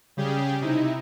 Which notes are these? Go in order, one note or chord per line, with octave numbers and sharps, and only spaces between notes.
C#3 G3 G4 G#4
C3 D#4 E4